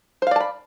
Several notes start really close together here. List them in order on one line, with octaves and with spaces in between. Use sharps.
C5 F5 D5 A5 B5